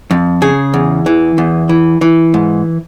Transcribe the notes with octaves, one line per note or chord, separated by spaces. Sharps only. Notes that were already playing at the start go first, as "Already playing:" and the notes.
F2
C#3 G#4
E2
E3
E2
E3
E3
G#2